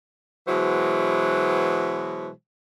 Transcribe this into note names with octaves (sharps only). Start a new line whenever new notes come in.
B2 E3 F#3 G#3 C5